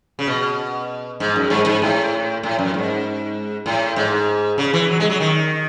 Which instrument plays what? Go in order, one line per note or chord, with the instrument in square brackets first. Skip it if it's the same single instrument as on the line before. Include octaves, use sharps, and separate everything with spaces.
[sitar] C#3
B2
G#2
F#2
G#2
G#2
A2
A2
F#2
G#2
A2
G#2
C#3
E3
F#3
G#3
F#3
D#3